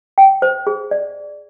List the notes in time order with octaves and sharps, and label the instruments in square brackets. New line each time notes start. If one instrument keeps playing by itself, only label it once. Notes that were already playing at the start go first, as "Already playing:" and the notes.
[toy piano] G5
C5
G#4
D5